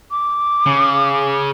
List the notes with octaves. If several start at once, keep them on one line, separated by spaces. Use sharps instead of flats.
D6
C#3